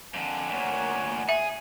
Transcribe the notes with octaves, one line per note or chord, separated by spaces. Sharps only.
F2 D3 G#5
D2 A#2 A#4 C#5 F#5
G#4 E5 G#5